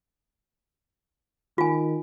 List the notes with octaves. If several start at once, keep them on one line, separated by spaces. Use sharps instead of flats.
D#3 F4 G#5